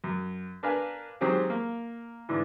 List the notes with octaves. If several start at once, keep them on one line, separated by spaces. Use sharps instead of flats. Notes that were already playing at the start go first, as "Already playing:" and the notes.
F#2
D4 A#4 B4 F5 G#5
D#3 F#3 G#3 C4 G4 G#4
A#3
G#2 D3 E3